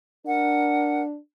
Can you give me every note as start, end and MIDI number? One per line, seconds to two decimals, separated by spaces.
0.26 1.18 62
0.26 1.02 70
0.26 1.02 78